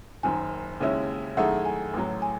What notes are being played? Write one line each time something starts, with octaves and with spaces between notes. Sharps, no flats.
F#1 F#2 D#3 G#5
D#2 C#3 G#3 C#4 E4
F#2 D#3 A3 E4 G#4 F#5
G#5
A1 A2 F#3
G#5